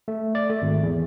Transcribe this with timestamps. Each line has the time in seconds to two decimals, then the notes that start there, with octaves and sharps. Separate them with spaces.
0.08 A3
0.35 D5
0.50 A3
0.62 G#1
0.83 E2